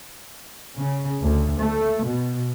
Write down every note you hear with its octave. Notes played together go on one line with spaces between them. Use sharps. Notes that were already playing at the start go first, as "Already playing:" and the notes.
C#3
D2
A3
B2